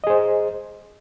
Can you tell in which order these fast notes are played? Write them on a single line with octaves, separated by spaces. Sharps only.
D#5 G#4 C5